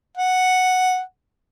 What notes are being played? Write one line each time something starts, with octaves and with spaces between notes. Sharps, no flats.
F#5